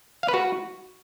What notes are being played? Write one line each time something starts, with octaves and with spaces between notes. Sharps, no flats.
F5
B4
F#4